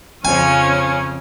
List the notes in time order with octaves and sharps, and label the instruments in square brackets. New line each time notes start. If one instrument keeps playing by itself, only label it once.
[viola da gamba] F2 C#3 F3 [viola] C#4 [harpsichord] G#5